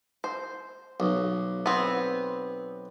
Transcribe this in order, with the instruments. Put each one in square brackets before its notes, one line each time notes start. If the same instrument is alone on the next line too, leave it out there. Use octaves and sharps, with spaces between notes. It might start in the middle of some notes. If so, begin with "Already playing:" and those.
[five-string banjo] C5
[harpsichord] B1
[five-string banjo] B3 C4